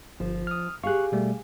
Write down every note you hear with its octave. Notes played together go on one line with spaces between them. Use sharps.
G1 F3
D#6 F6
G4 G#4 F5 C#6 F#6
B2 G3 A3